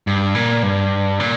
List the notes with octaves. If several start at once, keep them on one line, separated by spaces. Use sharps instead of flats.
G2
A#2
G2
A#2